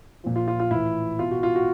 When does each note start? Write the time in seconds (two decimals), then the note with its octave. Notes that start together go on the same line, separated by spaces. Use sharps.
0.24 A#2 F3
0.36 F4
0.48 F4
0.60 F4
0.71 A2 E3 E4
1.19 B2 F4
1.31 F#4
1.43 F4
1.56 F#4